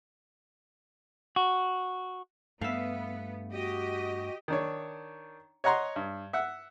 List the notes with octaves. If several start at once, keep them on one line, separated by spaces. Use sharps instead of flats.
F#4
G2 A3 B3 E5 F5
F#4 G4 D#5
D#3 D4 C#5
C#5 D#5 F#5 A#5 C6
G2
E5 F#5